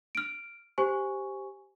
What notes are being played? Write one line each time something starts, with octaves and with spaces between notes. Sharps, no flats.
F6 D7
G4 C5 G#5 C#6